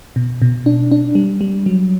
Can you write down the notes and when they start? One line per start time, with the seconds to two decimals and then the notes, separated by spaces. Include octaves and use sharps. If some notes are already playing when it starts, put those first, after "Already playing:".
0.16 B2
0.42 B2
0.66 D4
0.91 D4
1.15 G3
1.41 G3
1.66 F#3